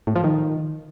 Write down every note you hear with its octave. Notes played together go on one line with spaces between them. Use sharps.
A2
F3
D#3